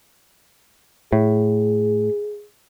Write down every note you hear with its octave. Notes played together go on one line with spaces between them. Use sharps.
A2 G#4